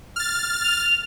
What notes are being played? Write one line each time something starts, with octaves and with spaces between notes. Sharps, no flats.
F6 A6
F7